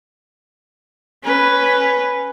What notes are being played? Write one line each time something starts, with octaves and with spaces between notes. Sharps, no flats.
C#4 B4